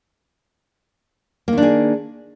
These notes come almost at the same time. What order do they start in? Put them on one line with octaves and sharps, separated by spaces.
A#3 D#3 D4 G#4